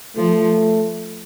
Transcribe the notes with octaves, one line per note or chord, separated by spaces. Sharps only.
F3 A3